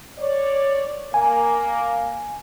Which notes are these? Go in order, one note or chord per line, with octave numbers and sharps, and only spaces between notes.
C#5 D5
A#3 G#5